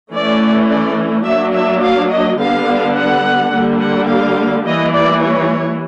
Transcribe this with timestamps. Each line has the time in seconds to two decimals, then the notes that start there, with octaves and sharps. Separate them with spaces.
0.13 E3 A3 C#4 D5
0.68 D5
1.25 F#3 A#3 D4 E5
1.54 E5
1.82 F5
2.11 D#5
2.39 D3 G3 B3 D4 F5
2.95 F#5
3.52 D3 G3 A#3
3.81 F#5
4.08 F5
4.65 E3 G3 A#3 D#5
4.93 D5
5.22 C#5